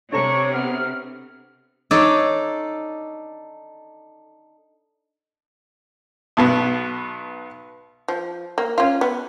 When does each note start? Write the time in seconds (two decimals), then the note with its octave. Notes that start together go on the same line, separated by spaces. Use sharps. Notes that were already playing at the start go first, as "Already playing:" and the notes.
0.13 C3 D4 A4 C#5 A#5 C#6
0.53 B3 F6
1.91 D4 D#4 A4 C#5 D5
6.37 B1 B2 B3
8.08 F3
8.58 A#3
8.78 C#4 F4
9.01 B3